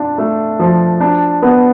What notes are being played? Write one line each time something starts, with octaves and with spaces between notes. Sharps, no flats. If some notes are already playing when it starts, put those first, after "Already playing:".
Already playing: D4 F4
A3
F3
D4
B3